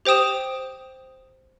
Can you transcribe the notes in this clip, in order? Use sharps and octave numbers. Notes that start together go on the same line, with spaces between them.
G4 C5 G5 D#6 E7